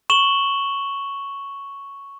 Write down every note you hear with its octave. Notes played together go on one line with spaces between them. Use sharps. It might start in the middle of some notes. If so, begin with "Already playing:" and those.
C#6 E7 F#7 G7